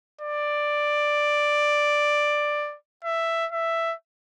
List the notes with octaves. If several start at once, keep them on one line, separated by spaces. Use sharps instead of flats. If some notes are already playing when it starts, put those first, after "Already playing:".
D5
E5
E5